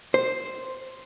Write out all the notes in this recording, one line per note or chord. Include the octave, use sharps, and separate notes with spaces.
C5